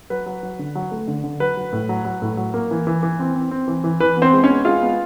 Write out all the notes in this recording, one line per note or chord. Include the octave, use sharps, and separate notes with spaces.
F#3 B4
F#3
F#3
D3
F#3
A3
D3
D3
F#3 B4
F#3
A2
F#3
F#3
A2
F#3
A#3
E3
E3
E3
C4
C4
C4
E3
E3
E3 B4
B3
C4 C5
G#3
C#4 C#5
B3
G#3 F4 F5
B3